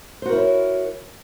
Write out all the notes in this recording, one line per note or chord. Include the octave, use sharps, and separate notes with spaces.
E4 F#4 A#4 C5 C#5